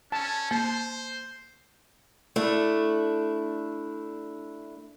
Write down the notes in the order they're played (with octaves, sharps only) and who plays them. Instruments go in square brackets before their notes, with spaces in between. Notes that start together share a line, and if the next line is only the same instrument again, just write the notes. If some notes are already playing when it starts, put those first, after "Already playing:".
[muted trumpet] C#4 [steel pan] A5
[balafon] A#3 [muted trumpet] C5
[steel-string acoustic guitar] A3 D4 E4